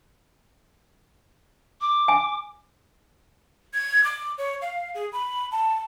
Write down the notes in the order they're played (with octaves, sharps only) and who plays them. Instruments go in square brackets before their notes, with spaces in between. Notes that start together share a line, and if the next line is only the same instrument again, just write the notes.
[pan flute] D6
[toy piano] G#5
[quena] G#6
D6
C#5
F5
G#4
B5
A5